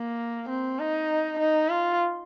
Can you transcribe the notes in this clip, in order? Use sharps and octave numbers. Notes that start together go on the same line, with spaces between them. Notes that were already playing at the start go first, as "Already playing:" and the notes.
Already playing: A#3
C4
D#4
D#4
F4